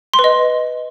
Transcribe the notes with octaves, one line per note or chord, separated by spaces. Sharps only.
C6
B4
D#5